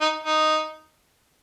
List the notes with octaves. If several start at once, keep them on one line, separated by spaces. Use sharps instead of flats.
D#4
D#4